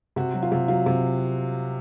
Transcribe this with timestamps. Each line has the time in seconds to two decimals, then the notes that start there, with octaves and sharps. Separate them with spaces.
0.16 C3 F#4
0.34 F#3
0.43 F4
0.52 C3
0.68 F#3 F4
0.86 C3